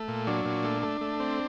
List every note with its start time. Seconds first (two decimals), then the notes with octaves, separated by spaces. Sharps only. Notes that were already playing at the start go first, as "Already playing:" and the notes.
Already playing: A3
0.08 A#2
0.27 F#3 D4
0.45 A#2
0.64 A3
0.82 A3
1.01 A3
1.20 C4